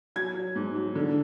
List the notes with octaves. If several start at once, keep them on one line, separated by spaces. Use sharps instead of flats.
F#3 G#6
F#3
G#2
F#3
D3